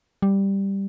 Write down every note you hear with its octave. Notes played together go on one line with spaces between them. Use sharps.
G3